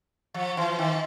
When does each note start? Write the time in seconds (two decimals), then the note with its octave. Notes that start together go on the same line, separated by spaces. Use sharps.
0.34 F3
0.57 E3
0.79 D#3